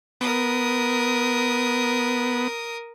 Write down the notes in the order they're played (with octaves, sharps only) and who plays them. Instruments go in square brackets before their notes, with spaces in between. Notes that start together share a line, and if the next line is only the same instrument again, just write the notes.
[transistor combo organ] B3 [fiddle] A#4 D#6